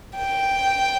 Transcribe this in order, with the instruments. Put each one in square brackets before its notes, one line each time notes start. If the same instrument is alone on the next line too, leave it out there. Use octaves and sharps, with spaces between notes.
[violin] G5